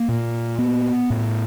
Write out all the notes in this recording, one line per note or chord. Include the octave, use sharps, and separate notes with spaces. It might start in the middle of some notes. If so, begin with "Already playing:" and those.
Already playing: A#3
A#2
B3
A2